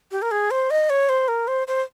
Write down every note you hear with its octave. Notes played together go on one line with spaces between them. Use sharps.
G4
A#4
G#4
C5
D#5
C#5
C5
A#4
C5
C5